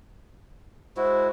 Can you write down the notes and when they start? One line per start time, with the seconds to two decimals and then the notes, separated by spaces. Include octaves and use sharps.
0.97 G#3 E4 F#4 C5